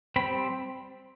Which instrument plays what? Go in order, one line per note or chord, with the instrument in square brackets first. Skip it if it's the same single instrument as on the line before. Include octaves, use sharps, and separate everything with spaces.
[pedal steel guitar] G3 C4 B5